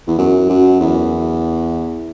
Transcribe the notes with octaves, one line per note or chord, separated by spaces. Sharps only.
E2
F#2
F#2
E2